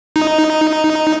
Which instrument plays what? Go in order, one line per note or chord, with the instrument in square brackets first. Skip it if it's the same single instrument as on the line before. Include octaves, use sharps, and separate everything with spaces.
[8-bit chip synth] D#4